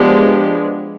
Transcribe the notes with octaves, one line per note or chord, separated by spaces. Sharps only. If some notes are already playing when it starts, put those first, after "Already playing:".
Already playing: F3 G#3 B3 D4 G4